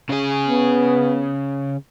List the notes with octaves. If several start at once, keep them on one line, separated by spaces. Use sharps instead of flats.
C#3 G#4
B3